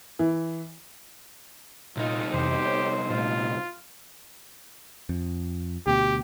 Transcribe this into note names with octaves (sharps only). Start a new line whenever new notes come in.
E3
C2 A#2 D#4 F4
F2 C3 E3 G4 C5
C#5
A#2 G3 A3 F4
F2
D2 B2 G4